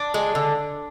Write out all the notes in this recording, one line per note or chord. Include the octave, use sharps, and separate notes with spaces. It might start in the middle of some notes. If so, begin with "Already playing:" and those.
Already playing: D4
G#3
D3